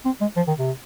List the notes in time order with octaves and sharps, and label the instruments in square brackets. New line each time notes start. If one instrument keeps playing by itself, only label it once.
[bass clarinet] C4
G#3
F3
D#3
C3